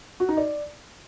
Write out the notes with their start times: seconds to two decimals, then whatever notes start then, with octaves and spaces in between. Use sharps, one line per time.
0.20 F#4
0.29 D#4
0.37 D5